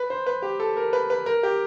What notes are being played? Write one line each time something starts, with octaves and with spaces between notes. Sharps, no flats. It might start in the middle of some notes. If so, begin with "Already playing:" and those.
Already playing: B4
C5
B4
G4
A4
A#4
B4
B4
A#4
G4